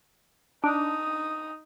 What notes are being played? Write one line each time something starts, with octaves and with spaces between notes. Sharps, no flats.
D4 D#4 D#6